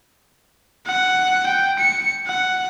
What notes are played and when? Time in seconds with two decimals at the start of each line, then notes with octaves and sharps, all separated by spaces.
0.87 F#5
1.47 G5
1.79 C#7
2.27 F#5